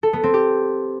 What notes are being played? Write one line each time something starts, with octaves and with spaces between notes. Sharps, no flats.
A4
B3
C4
G4